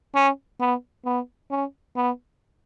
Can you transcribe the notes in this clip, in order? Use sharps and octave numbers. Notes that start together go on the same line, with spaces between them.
C#4
B3
B3
C#4
B3